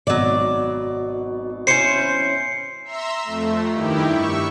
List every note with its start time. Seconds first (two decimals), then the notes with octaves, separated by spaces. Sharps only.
0.07 G#1 B2 F#3 D5
1.67 C#4 E4 C5 C7 C#7
2.84 E5 A#5 C6 E6
3.24 F2 A3
3.73 G2 D#3 E4 G4
4.05 E5 C#6